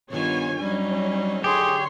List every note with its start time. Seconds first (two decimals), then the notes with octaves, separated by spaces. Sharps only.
0.10 G2 D#3 B3 F4 C#5 G#5
0.61 F#3 G3 C#4 D#4
1.44 D3 G4 G#4 C#5 C6